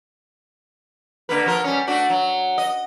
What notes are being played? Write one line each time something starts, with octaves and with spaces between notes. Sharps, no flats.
D3 A#3 B4
F3 F4 A#4
G3 C#4
A3 D4 F#4
F#3
D#5